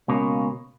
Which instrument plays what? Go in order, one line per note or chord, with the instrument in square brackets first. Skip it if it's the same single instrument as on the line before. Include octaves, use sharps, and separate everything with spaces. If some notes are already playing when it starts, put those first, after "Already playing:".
[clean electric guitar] C#2 B2 A#3 C#4